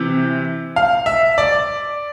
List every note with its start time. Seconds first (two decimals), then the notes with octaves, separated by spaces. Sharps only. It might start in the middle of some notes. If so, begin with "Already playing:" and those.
Already playing: C3 E3
0.76 F5
1.06 E5
1.38 D5